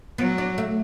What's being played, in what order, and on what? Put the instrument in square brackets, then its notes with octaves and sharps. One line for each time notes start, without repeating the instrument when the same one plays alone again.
[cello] F#3 [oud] B3
[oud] D4
A3